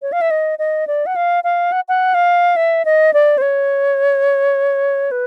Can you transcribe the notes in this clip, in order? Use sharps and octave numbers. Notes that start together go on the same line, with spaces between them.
C#5
F5
E5
D#5
D#5
D5
F#5
F5
F5
F#5
F#5
F5
E5
D#5
D5
C5
C#5
B4